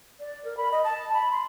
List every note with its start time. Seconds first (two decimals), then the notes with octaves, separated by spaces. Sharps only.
0.20 D5
0.45 A#4
0.57 B5
0.72 D#5
0.84 A5
1.13 B5
1.31 C6